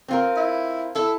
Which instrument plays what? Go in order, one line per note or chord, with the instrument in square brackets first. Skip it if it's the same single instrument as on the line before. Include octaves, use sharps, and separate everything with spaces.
[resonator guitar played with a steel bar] C4 F4 A#4
[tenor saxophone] E4
[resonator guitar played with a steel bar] E4 [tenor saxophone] A4